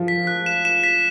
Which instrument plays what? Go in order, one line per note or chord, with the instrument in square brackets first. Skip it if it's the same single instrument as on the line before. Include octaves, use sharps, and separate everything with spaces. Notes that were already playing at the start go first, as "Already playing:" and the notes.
Already playing: [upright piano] F3
[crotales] B6
F#6
E7
E7
B6